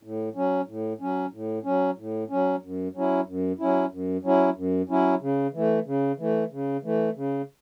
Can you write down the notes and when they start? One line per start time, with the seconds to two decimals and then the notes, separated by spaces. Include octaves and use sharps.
0.03 A2
0.35 F#3 C#4
0.67 A2
1.01 F#3 C#4
1.33 A2
1.64 F#3 C#4
1.98 A2
2.30 F#3 C#4
2.62 F#2
2.95 F#3 C#4 E4
3.26 F#2
3.59 F#3 C#4 E4
3.91 F#2
4.24 F#3 C#4 E4
4.56 F#2
4.89 F#3 C#4 E4
5.21 C#3
5.53 E3 A3
5.86 C#3
6.18 E3 A3
6.51 C#3
6.83 E3 A3
7.16 C#3